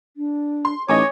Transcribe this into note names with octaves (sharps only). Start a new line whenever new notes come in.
D4
C6
A1 D#4 C#5 D#5 G#5 D6